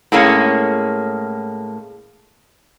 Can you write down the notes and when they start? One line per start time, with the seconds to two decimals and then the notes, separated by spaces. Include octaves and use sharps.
0.12 A2 G#3 A#3 C#4